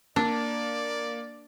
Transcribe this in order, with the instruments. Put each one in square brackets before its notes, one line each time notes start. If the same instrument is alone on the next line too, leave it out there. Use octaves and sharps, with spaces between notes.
[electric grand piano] A#3 [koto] D4 [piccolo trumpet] D5